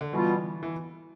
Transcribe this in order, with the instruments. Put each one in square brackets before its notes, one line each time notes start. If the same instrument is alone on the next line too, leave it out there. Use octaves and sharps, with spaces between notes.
[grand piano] D3
[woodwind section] B2 G3 B3 F4 [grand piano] E3
[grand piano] E3